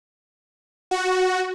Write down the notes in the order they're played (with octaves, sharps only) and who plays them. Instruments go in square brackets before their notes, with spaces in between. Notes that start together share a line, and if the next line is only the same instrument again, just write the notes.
[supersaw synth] F#4